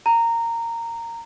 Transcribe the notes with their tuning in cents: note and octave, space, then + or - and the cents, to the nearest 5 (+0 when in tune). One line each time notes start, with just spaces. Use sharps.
A#5 -15